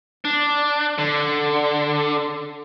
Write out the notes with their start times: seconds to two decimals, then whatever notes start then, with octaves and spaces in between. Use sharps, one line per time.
0.25 D4
0.98 D3